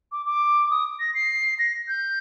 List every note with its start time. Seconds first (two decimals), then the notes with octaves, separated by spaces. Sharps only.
0.12 D6
0.26 D6
0.71 D#6
1.00 A#6
1.15 C7
1.59 A#6
1.88 G6